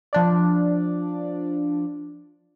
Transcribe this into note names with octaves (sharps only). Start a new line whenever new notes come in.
F3 D4 D5